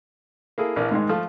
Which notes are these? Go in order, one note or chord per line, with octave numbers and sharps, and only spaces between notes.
A#3 E4 G#4 A4
A#1 E3 A#4 D5
G#2 D#3 G#3
F3 A3